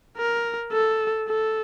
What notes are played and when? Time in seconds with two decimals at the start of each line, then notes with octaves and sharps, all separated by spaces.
0.17 A#4
0.73 A4
1.29 A4